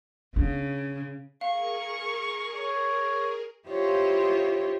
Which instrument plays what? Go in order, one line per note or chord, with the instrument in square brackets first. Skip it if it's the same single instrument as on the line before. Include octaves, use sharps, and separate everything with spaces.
[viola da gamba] C#3 [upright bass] B3 D4
[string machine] G#4 A#4 [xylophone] F5 [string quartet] C#6
[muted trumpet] C#5
[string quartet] E4 F4 G4 C5 C#5 D#5